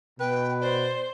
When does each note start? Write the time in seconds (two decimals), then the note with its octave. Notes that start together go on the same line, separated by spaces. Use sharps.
0.20 B2 B4 G5
0.60 C5 D5